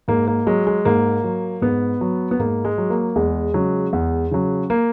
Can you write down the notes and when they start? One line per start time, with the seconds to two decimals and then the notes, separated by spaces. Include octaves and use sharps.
0.08 G#2 A#3
0.27 A#3
0.46 F#3 G#3
0.67 G#3
0.85 G#2 A#3
1.24 F#3
1.62 G#2 B3
2.01 F#3
2.31 B3
2.39 G#2 A#3
2.65 G#3
2.78 F#3
2.90 A#3
3.16 E2 G#3
3.54 C#3 F#3
3.93 E2
4.31 C#3 F#3
4.70 A#3